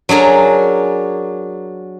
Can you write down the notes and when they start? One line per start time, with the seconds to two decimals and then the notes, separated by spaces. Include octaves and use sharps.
0.09 F#3 D4 G#4 A#4